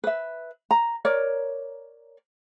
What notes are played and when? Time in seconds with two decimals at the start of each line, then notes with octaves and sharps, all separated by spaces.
0.04 B4 E5
0.71 A#5
1.05 A#4 C#5 D5